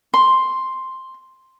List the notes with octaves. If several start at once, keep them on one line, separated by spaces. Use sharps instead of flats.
C6